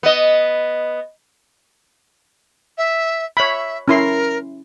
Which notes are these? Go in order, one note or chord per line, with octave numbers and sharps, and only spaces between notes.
B3 D#5
E5
C#5 E5 B5
C#4 E4 A#4 C6